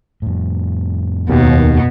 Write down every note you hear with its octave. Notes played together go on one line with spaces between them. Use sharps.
F2 A2
D#2 B2